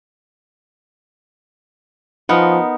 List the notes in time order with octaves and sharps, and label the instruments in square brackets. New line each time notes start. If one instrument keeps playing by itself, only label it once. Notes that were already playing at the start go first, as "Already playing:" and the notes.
[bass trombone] F3 [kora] B3 D#4 A#4